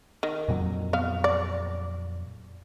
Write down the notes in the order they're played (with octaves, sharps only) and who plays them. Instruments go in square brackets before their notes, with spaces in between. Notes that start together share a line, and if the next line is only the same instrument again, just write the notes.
[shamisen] D#3
[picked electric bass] F2 A#2 F#3
[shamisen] B3 F5
D5